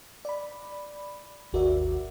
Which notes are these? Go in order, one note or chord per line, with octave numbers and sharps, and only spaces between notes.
D5 B5
G#1 D#2 F#4 A#4 D5 E5